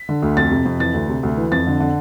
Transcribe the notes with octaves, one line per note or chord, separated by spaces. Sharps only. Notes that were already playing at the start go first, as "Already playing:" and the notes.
Already playing: B6
D3
D2
F2 A6
C3
F2
E3 A6
D2
C3
D2
E3
F2 A6
D3
D3